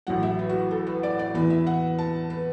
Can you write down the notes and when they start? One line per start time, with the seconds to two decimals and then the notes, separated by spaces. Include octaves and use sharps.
0.07 A1 A2 F#3 F#5
0.23 E5
0.39 B4
0.49 F#4
0.71 A4
0.87 B4
1.03 D5
1.19 D5
1.34 E2 E3 B4
1.50 E5
1.67 F#5
1.98 A5
2.30 B4